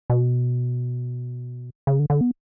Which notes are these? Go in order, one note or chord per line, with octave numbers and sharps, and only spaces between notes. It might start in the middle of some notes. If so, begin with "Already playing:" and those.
B2
C#3
D3
D3
B3